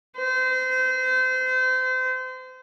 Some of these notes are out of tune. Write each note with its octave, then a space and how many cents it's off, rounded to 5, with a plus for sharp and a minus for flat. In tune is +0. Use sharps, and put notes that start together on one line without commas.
C5 -30